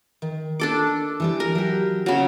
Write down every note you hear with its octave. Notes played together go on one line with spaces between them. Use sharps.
D#3
D4 A4 D6
E3 G3 D5
A#4
F#3 G4
C#3 F#3